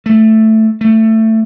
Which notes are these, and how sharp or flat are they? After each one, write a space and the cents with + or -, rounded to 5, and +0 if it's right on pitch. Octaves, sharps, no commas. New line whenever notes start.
A3 +0
A3 +15